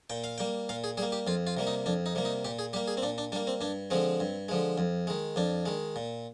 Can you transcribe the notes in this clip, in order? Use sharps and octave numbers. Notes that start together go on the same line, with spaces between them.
A#2 G5
F5
G3 A#3 G5
A#2 F5
G#4
G3 A#3 G#4
G4
F2 F4
F4
C3 G3 A#3
D#4
F2 D4
D#4
C3 G3 A#3
D#4
A#2 G4
G#4
G3 A#3 G4
G#4
C4
A#2 D4
D4
G3 A#3 D4
C4
G2 D4
D3 F3 G#3 C4
G2
D3 F3 G#3
F2
D#3 G#3
F2 D4
D#3 G#3
A#2